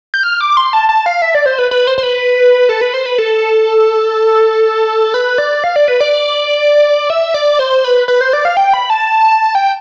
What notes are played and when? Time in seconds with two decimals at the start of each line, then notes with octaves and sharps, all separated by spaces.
0.14 G6
0.23 F6
0.41 D6
0.57 C6
0.73 A5
0.89 A5
1.06 F5
1.22 E5
1.35 D5
1.46 C5
1.59 B4
1.71 B4
1.87 C5
1.98 C5
2.03 B4
2.69 A4
2.81 B4
2.94 C5
3.06 B4
3.18 A4
5.14 B4
5.38 D5
5.64 F5
5.76 D5
5.88 B4
6.01 D5
7.10 E5
7.34 D5
7.59 C5
7.84 B4
8.08 B4
8.21 C5
8.33 D5
8.45 F5
8.57 G5
8.74 B5
8.90 A5
9.55 G5